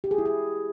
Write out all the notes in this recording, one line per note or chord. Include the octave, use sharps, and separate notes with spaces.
G4
G#4
E4
G#4